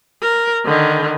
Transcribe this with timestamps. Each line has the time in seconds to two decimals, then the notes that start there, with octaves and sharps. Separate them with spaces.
0.22 A#4
0.66 D3 D#3